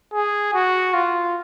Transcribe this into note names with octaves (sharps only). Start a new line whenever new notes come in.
G#4
F#4
F4